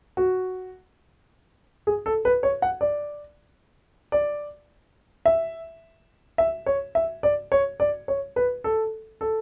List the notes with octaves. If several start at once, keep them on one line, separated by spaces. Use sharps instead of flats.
F#4
G#4
A4
B4
C#5
F#5
D5
D5
E5
E5
C#5
E5
D5
C#5
D5
C#5
B4
A4
A4